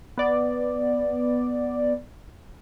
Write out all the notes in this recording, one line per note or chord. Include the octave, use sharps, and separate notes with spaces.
B3 D5